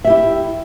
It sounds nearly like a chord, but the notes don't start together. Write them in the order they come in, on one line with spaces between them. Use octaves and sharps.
E5 G4 E4